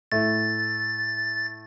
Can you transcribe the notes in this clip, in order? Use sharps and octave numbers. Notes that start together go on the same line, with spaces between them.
A2 A3 E4 A6